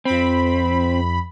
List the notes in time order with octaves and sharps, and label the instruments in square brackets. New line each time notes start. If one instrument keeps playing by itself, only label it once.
[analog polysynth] F2 B5 [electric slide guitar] C4